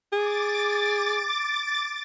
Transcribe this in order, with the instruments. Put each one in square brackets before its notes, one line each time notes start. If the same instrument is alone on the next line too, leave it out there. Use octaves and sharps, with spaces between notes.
[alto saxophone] G#4 [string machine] D6 A6